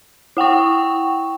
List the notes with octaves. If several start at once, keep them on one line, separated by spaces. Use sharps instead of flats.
E4 F#5 G5 C#6